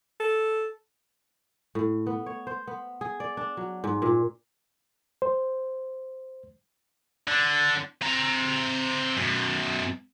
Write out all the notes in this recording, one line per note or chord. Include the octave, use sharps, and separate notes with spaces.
A4
A2
B3
C#5
C5
B3
G#4
D5
D4
F#3
G#2
A#2
C5
D3
C4 A#5
F#2 B2